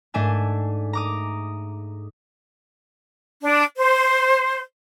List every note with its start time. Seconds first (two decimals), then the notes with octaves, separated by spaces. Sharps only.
0.14 G#2 A3 D4 G#5 E7
0.93 A#5 D6 D#6
3.41 D4
3.77 C5